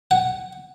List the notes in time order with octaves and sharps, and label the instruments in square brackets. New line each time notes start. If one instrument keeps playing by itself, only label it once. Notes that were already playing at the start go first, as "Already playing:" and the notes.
[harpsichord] F#5